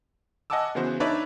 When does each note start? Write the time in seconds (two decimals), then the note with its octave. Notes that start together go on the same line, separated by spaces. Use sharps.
0.50 D#5 F#5 G#5 A5 D6 E6
0.75 C#3 E3 B3 F#4 C5
1.00 D4 D#4 B4 C#5 D5 E5